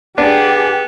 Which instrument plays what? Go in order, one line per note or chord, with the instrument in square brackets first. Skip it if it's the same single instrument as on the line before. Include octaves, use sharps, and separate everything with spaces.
[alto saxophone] B3 [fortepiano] D4 [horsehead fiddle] G4 G#4